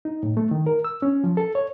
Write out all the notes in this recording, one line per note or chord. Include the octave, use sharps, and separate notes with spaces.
D#4
A2
A3
D#3
A#4
E6
C#4
F3
A4
C#5